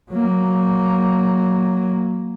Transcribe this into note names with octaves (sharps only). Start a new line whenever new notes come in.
F#3 A#3